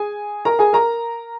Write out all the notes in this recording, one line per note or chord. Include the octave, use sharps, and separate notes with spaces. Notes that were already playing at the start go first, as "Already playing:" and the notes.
Already playing: G#4 G#5
A#4 A#5
G#4 G#5
A#4 A#5